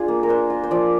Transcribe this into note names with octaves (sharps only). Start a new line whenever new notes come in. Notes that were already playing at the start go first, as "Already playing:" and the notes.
Already playing: D4 F4 G#4
A#3
A#4
D4 C5
F4
C5
F3 D5